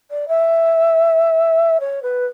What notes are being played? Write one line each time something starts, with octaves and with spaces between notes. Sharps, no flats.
D5
E5
C#5
B4